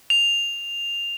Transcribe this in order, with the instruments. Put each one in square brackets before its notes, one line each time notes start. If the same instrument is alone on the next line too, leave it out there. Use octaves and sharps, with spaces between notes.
[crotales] F7